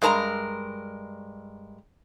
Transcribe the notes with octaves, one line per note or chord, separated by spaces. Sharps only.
G2 G#3 A#4 A5 A#5